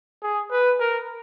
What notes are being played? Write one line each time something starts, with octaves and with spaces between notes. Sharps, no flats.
G#4
B4
A#4